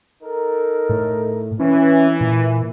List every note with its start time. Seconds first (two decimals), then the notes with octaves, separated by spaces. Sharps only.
0.22 D#4 A4 A#4
0.89 A2
1.60 E3 C#4
2.21 A#2